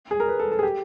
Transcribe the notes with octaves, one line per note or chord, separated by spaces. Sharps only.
G#4
A#4
B4
A4
A4
G#4
G4